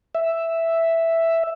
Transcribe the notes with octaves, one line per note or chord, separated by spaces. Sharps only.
E5